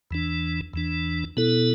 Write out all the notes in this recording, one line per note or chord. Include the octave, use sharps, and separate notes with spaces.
E2 E3 D4
E2 E3 D4
B2 B3 E4 A4